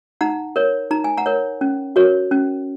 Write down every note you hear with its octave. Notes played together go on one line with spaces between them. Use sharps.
D#4 F#5 A#5
A#4 C#5
D#4 A#5
G#5
F#5 A#5
A#4 C#5
C#4
F#4 A#4 C#5
C#4